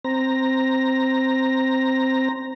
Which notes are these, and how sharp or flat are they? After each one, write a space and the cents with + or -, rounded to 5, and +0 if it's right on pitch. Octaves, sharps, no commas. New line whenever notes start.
C4 +0 A#5 +0